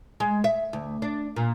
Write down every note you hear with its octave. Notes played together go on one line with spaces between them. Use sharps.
G#3
E5
D2
D4
A#2